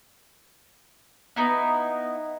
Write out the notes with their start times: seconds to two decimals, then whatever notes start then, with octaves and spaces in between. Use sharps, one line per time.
1.36 B3 D#4 E4